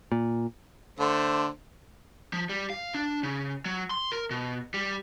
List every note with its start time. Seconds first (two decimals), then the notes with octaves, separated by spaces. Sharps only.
0.12 A#2
0.99 D3 A3 C5
2.33 F3
2.49 G3
2.70 F5
2.94 D4
3.23 C#3
3.65 F#3
3.90 C6
4.12 A#4
4.30 B2
4.74 G3